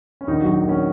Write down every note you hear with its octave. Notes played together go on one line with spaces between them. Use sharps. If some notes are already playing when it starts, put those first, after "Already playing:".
C#4
A#1 D#3 D#4
A#1 F#3 F#4
A#1
C#4